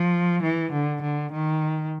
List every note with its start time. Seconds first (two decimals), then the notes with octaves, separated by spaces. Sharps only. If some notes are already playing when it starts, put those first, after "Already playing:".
Already playing: F3
0.43 E3
0.73 D3
1.02 D3
1.32 D#3